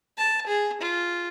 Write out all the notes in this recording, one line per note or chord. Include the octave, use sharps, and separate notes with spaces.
A5
G#4
F4